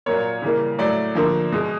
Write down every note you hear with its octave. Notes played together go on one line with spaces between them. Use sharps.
A#2 F#3 A#3 C#5
C#3 E3 G3 A#3
A2 F#3 A3 D5
D3 F3 A#3
B2 G#3